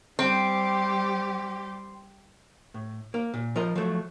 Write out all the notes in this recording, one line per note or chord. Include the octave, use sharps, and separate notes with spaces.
G3 C4 G4
A2
A#3
A#2
F3 F4 A#4 D#5
F3 F#3 A3